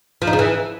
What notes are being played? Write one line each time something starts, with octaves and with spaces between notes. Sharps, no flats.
F3
D#4
C#3
E3